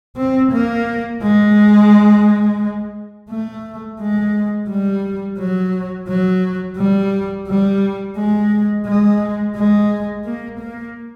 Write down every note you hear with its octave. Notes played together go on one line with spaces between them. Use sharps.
C4
A#3
G#3
A3
G#3
G3
F#3
F#3
G3
G3
G#3
G#3
G#3
A#3
A#3